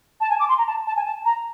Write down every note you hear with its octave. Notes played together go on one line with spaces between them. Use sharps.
A5
G#5
D6
C6
A#5
A5
A5
G#5
A5
A#5